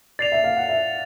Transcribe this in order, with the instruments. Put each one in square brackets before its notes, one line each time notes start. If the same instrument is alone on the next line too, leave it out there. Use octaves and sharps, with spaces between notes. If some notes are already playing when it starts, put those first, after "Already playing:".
[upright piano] D5 [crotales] A6 C7 F7
[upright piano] E5
F5
F#5
E5